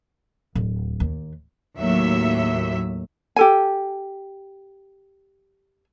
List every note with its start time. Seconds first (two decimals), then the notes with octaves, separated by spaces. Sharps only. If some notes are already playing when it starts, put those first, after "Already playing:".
0.55 D1
1.00 D#2
1.78 D#2 A2 F#3 E5
3.36 G4 A4 G#5